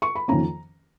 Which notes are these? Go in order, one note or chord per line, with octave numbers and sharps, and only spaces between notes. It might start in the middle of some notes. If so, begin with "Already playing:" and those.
C#6
B5
F2 D#3 A#3 C#4 A#5